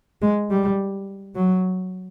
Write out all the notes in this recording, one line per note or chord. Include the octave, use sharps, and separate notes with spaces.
G#3
G3
F#3